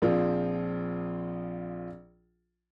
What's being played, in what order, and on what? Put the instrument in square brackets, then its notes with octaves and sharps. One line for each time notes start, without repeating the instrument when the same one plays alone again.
[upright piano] A#1 F3 C4 F4 G#4